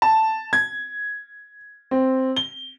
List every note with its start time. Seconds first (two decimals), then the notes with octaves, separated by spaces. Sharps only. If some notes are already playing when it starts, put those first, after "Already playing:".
0.02 A5
0.53 G#6
1.91 C4
2.36 G7